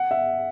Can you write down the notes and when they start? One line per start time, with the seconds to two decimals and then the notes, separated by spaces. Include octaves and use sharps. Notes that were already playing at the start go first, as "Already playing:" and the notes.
Already playing: F#5
0.11 E5